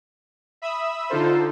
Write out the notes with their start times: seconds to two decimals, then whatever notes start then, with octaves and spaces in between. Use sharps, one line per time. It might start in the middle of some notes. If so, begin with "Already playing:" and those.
0.62 E5 B5 D#6 E6
1.10 D3 D#4 F4 A4 C5